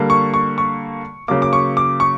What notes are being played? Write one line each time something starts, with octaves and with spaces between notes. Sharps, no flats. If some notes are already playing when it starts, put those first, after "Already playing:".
Already playing: D3 G3 A#3
C#6
C#6
C#6
C#3 F#3 A#3 D6
D6
C#6
D6
C#6